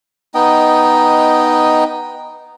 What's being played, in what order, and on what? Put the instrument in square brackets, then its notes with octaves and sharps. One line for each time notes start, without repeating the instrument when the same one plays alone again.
[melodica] B3 D#4 D#5 G5